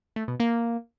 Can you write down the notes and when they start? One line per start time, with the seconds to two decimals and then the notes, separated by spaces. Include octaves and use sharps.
0.16 A3
0.28 B2
0.40 A#3